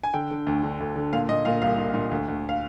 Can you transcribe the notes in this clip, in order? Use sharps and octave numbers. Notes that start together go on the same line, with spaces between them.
G#5
D3 G5
D3
D2
D3
D2
D3
A#2 F5
A#2 D#5
A#2 F5
C2 F5
A#2
A#2
D2
D2
F5